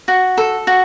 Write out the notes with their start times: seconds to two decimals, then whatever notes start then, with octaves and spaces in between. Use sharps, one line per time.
0.08 F#4
0.37 A4
0.67 F#4